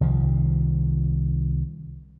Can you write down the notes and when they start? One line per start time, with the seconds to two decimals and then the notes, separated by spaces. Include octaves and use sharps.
0.01 C2 D#3 F3